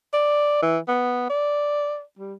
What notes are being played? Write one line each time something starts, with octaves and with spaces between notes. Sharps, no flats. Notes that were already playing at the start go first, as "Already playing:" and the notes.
D5
E3
B3
D5
G3